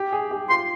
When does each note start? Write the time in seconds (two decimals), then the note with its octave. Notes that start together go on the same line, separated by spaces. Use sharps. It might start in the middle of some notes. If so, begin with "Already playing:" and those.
Already playing: G4
0.13 G#4
0.31 G4
0.50 F4 C6